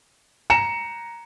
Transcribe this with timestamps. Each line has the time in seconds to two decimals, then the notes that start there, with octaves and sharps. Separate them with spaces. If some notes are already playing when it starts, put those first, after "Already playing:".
0.50 A#5 C#7 E7